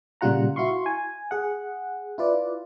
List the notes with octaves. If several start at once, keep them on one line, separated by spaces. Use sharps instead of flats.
A#2 C#3 G3 F4 F#5 A#5
E4 F#4 F5 C6 C#6
G#5
G#4 F#5
E4 F4 B4 D5